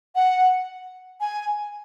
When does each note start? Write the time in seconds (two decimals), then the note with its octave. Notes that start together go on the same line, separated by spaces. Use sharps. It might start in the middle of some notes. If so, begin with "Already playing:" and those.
0.15 F#5
1.21 G#5